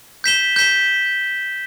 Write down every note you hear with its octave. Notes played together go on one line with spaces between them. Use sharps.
G6 B6 E7 G7
G6 B6 E7 G7